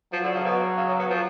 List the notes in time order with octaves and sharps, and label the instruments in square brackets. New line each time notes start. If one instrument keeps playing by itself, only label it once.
[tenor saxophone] F3 [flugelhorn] F#3
[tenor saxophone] D3
C#3
B2
C#3
C#3
B3
F3